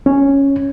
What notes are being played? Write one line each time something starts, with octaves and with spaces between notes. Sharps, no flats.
C#4